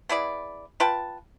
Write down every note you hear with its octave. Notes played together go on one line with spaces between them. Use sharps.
B3 E4 G#4 D5
F4 B4 G5 A5